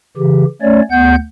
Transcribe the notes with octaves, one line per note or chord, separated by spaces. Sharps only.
C#3 E3 G4
A3 C#4 C#5 D5
D2 B3 F#5 G6